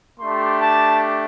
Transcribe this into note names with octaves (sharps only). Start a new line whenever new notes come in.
A3 D4 G4 C6
A5